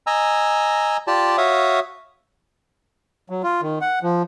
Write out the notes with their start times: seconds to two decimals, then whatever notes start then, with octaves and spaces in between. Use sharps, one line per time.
0.07 D#5 G#5 A#5 E6
1.07 F4 G4 D5 A5
1.38 F#4 C#5 E5 F5 D#6
3.30 F#3
3.43 F4
3.62 D#3
3.81 F#5
4.02 F3